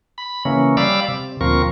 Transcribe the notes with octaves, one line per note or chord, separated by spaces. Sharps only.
B5
C#3 E3 A#3 C#4
G3 D5 F5 B5 D6 E6
C3
D2 A#2 F3 C4 A#4 C#6